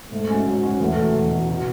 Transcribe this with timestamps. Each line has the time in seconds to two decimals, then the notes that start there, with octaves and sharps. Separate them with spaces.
0.11 G#2 A3
0.29 G#3 C#4 F#4
0.46 G#2 F#3
0.63 G#3 C#4 F#4
0.80 E2 A3
0.97 B2 F#3
1.14 E2
1.32 B2 F#3
1.49 B2